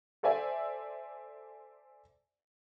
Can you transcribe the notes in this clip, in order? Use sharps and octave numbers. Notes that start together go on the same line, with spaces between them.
A4 C5 D5 E5 G#5